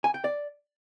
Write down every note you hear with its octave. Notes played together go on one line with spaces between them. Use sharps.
G#5
G5
D5